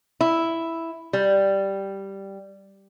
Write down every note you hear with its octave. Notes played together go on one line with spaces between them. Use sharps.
E4
G3